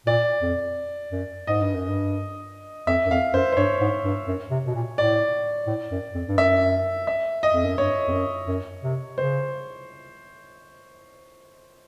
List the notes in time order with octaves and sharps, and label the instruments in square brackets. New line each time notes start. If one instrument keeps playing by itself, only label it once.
[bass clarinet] A#2 [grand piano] D5
[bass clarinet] F2
F#2
[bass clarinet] G#2 [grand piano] D#5
[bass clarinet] G2
F#2
G2
[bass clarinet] F2 [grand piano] E5
[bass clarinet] F#2
[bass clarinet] F2 [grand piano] F5
[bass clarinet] F#2 [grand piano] C5
[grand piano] C5
[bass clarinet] G2 [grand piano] C#5
[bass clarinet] G#2
G2
F#2
C3
B2
A#2
[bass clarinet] A2 [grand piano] D5
[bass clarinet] A2
F#2
F2
G2
[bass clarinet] F#2 [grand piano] E5
[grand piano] E5
D#5
[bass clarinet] F2
F#2
[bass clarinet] G2 [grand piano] C#5
[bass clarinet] F2
F#2
F#2
C3
[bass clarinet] C#3 [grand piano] C5